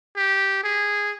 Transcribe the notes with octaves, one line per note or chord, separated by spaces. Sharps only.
G4
G#4